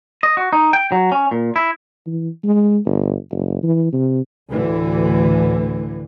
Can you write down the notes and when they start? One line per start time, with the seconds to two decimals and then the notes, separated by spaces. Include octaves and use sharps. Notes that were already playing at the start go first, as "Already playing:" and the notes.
0.23 D#5
0.37 F#4
0.53 D#4
0.73 G5
0.92 F#3
1.12 C#4
1.31 A#2
1.56 E4
2.06 E3
2.44 G#3
2.86 G1
3.31 F#1
3.63 E3
3.92 C3
4.50 D2 A2 D3 E3